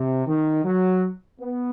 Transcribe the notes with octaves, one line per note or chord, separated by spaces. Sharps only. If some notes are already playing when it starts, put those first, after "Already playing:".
Already playing: C3
D#3
F#3
B3